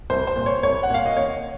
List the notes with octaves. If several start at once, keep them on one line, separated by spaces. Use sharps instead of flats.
C2 C5
C5
A#2
C#5
C2 C#5
F#5
A#2 F5
D#5
D#2 C#5